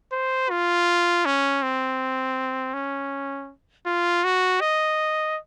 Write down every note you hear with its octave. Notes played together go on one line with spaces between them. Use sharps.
C5
F4
C#4
C4
C#4
F4
F#4
D#5